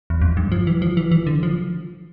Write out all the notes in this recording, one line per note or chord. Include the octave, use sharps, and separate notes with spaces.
E2
F2
G2
F3
E3
F3
E3
E3
D3
F3